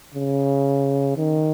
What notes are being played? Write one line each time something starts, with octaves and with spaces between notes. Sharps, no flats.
C#3
D#3